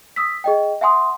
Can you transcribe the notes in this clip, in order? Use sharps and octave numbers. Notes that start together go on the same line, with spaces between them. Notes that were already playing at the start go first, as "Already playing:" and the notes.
D#6 E6 B6
G#4 D#5 G5
E5 F#5 G#5 C6 D#6